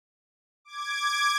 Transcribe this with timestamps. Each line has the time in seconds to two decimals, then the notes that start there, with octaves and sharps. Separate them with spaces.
0.65 D6 G#6